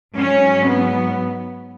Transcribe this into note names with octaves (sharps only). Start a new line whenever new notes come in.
G#2 F#3 C#4
B3